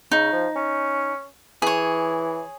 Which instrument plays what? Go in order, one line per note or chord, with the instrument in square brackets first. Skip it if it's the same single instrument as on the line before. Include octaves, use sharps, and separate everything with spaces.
[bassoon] C#3 [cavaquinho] D#4
[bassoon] F3
C#4
[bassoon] E3 [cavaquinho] G#4 C#5